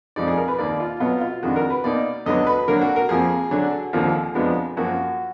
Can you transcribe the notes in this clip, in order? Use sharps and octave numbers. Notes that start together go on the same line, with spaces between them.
F2 F3 G#3 D#4 D5
G#4
A#4
B4
D#2 D#3 A#3 D5
F4
B2 F#3 B3 F4
F4
F2 D#3 G#3 D4 F#4
A#4
B4
B2 A#3 D#4 D5
D2 D3 F#3 B3 D4 D#5
B4
D3 F#3 A#3 D4 A#4
F#4
A#4
F2 F3 A#3 G#4
D3 F#3 D4
D#2 D3 F3 A#3
F2 F3 G#3 B3 D4
F#2 F3 A#3 F#4